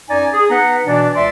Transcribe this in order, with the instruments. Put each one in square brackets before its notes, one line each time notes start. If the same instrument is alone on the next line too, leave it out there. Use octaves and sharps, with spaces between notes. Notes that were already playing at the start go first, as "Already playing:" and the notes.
[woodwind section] F#2 D#4 D5 G#5
G#4
B3 D#4 B4 F#5
B2 E3 D4 D5
C#2 D5 E5 C6